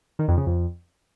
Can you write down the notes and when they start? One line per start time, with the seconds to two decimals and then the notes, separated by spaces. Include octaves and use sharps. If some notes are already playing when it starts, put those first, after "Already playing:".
0.19 D#3
0.28 F2
0.37 C#3
0.46 F2